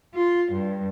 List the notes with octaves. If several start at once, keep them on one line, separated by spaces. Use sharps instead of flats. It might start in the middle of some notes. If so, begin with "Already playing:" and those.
F4
G2